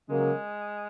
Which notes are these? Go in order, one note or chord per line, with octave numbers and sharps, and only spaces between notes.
C#3 F#3 G#3 A#3